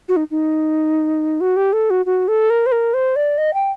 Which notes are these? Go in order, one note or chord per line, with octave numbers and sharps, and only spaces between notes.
F#4
D#4
D#4
F#4
G4
A4
F#4
F#4
A4
A#4
C5
A#4
C5
D5
D#5
G5